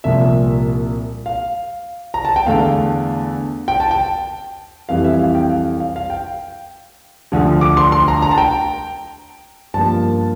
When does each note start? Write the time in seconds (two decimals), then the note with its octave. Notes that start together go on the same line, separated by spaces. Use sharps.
0.04 C2 A#2 F3 E5
1.26 F5
2.14 A#5
2.25 A5
2.36 G5
2.46 E2 D3 A3 F5
3.68 G5
3.80 A5
3.91 G5
4.89 F2 E3 G3 F5
5.04 E5
5.19 F5
5.35 G5
5.49 F5
5.80 F5
5.96 F5
6.10 G5
7.32 D2 D3 F3
7.61 D6
7.77 C6
7.92 C6
8.08 A#5
8.22 A#5
8.31 A5
8.38 G5
9.74 G2 F3 A#3 A5